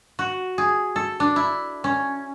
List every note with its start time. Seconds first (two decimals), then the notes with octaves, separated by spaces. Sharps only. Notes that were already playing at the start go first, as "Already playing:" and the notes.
0.19 F#4
0.58 G#4
0.96 A4
1.20 D4
1.36 E4
1.84 C#4